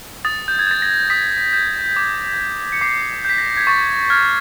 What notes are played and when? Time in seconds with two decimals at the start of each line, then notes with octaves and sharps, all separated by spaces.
0.25 D#6 A6
0.48 G6
0.59 G#6
0.67 G6 A6
0.82 A#6
1.10 D#6 B6
1.53 G6
1.96 D6
2.38 G6
2.72 C#7
2.81 D6 C7
3.25 G6 B6
3.38 A#6
3.57 G#6
3.67 C#6 A6
4.10 F6 G#6